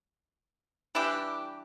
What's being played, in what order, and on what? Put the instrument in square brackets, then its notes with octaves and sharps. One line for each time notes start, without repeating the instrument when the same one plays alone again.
[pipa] E3 G3 D4 E4 G4